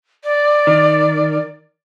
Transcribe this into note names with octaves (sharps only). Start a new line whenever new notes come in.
D5
D#3